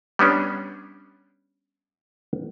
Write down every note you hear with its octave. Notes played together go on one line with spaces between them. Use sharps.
G3 B3 C#4 D4